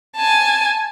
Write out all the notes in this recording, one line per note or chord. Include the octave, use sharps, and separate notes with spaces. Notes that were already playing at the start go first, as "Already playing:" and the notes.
G#5 A5